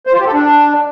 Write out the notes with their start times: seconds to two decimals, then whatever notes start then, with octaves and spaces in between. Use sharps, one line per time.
0.07 C5
0.13 F4
0.20 G4
0.26 A4
0.33 D4